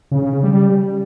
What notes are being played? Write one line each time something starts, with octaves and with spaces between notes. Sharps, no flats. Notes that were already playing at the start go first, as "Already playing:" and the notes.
C#3
C#3
C#3
G3